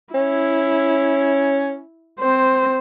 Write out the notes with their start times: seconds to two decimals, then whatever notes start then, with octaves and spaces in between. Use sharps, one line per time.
0.14 C#4 E4
2.19 C4 C5